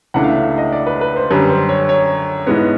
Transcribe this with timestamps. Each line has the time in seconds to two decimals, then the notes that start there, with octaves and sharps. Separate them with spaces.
0.14 C#2 C#3 E3 A3 D4 F#5
0.24 F5
0.29 E5
0.43 E5
0.58 D#5
0.72 D5
0.87 B4
1.01 B4
1.16 C5
1.30 F#2 D3 G3 B4
1.50 C5
1.69 C#5
1.89 C#5
2.47 G#2 E3 G#3 B3